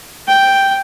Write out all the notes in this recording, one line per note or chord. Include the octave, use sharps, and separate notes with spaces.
G5